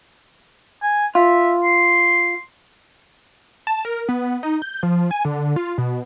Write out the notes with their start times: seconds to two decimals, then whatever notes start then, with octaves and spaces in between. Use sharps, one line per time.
0.82 G#5
1.15 F4 E5
1.63 C6
3.67 A5
3.85 A#4
4.09 B3
4.43 D#4
4.62 G6
4.83 F3
5.11 G#5
5.25 D3
5.56 F4
5.78 B2